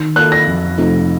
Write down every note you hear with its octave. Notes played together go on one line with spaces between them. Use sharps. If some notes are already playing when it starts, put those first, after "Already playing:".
Already playing: D#3
A#3 F4 A4 F#6
A#6
F2
C3 F3 A3 D#4